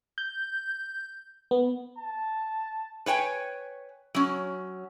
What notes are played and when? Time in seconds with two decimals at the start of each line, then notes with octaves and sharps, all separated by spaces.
0.18 G6
1.51 B3
1.98 A5
3.06 B4 C#5 G5 G#5
4.15 F#3 C#4